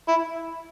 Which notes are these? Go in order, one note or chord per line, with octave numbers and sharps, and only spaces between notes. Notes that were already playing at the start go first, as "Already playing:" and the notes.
E4